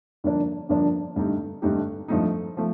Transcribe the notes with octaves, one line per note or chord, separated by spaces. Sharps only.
G2 D3 F3 A#3 D4
G2 D3 F3 A#3 D4
G2 D3 A3 D#4 G4
G2 D3 A3 D#4 G4
G2 F3 A3 D#4
F3 A3